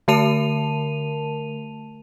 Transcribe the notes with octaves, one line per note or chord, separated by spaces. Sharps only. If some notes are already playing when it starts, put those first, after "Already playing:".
D3 A3 A#4 A5 D#7 F7